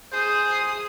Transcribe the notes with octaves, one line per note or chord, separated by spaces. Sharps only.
G#4 C5 D#6